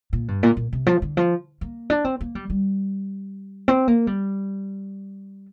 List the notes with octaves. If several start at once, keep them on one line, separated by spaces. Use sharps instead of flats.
A#2
G2
A#2
A#2
C3
F3
D3
F3
A#3
D4
C4
A#3
G3
G3
C4
A#3
G3